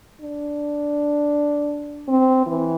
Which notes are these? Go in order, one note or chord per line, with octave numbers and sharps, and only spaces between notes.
D4
C4
E3